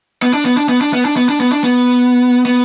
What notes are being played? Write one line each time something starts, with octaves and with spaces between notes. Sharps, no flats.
B3
D4
B3
D4
B3
D4
B3
D4
B3
D4
B3
D4
B3
B3